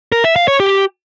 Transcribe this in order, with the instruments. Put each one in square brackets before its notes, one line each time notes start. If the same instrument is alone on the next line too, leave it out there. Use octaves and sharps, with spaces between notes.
[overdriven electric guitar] A#4
E5
F5
C#5
G4